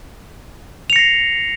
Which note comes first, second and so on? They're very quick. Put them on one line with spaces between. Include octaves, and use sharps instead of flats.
F7 C#7 A#6 C7